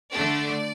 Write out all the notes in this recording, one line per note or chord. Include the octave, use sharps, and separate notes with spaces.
D3 A3 D4 D5